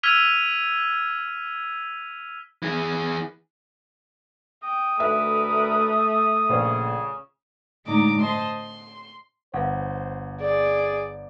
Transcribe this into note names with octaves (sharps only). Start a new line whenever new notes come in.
E6 F6 G#6 B6 D#7 F7
E3 G#4
G5 D#6
D2 A3 A#4 B4 E5
A#1 C#3 B4 C5
A2 D3 G#3 D#4 A#5 D6
C5 D#5 A5 C6
C6
G1 B4 C5 F5 F#5
G#4 D5